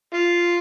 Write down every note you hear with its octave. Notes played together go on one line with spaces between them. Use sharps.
F4